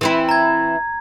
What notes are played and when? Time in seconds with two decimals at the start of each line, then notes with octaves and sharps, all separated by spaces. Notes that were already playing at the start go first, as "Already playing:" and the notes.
0.01 E3 C4 E4
0.29 A#5 G#6